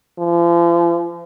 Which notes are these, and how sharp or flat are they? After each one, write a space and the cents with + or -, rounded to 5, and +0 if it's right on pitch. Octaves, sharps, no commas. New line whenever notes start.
F3 -40